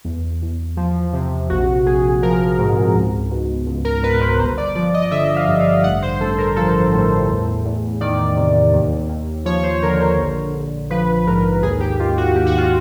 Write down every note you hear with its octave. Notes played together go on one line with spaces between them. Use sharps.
E2
E2
F3
C3
A#1 F#4
A#1 G#4
F3 A#4
G#2
C#2
B2
C#2
A#4
B2 B4
C5
G1 C5
D5
F3 D5
D#5
D3 E5
F5
G2
F5
A1 F#5
C5
A1 A4
A#4
F3 A4
A2
E2
E2
D#3 D5
C3
D#2
D#2
F3 C#5
C5
D3 A#4
C5
A#1
A#1
F3 B4
G#2 A#4
D#2 G#4
G4
D#3 F4
F#4
D#2 G4
F#4
F4